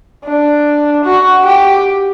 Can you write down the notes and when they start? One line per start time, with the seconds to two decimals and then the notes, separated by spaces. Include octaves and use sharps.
0.25 D4
1.05 F#4
1.45 G4